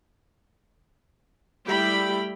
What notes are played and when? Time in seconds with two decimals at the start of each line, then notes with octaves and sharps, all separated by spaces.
1.67 G3 A3 E4 G4 G5 B5